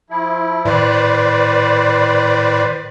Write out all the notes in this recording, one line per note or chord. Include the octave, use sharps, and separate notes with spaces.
F3 E4
A2 D#3 B4 C5 D5